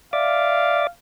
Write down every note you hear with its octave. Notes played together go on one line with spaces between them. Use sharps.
D5 E5 F5 D6